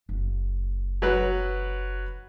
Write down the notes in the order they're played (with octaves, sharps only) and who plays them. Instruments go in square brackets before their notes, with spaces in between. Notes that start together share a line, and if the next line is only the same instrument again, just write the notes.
[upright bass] F#1
[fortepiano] F#3 B4